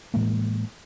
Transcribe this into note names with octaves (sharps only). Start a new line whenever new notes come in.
A2 E3 G#3 A#3